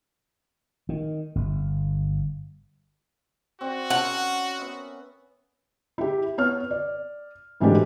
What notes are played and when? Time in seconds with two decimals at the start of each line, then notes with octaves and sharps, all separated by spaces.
0.89 D#3
1.35 G1
3.61 C4 F#4 D5
3.90 C#4 A#4 C5 F#5
4.59 B3 E5
5.98 E4 G4
6.38 B3 C#5 F6
6.71 D5
7.60 G#2 E3 F#3 A3 D4 G4